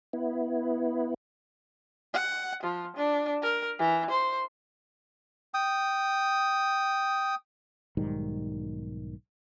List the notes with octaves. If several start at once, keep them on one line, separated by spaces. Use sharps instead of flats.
B3 E4
F#5
F3
D4
A#4
E3
C5
G5 D#6
B1 G#2 D#3 G3